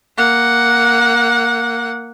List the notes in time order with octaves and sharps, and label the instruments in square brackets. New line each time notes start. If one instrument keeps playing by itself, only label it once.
[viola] A#3 F#5